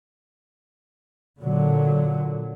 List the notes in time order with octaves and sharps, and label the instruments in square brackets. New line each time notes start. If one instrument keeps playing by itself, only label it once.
[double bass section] A#2 D3 F#3